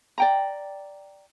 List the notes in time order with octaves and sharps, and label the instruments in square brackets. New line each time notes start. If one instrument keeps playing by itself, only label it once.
[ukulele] D5 G5 A#5